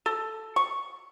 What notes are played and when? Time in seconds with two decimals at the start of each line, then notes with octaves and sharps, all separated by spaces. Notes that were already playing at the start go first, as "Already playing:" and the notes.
0.06 A4
0.56 C#6